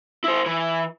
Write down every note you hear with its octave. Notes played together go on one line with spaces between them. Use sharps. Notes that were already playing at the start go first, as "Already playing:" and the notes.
E4 C5
E3